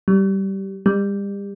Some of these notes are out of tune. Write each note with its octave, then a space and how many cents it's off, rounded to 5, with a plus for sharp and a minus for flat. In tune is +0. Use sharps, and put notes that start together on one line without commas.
G3 -15
G3 +35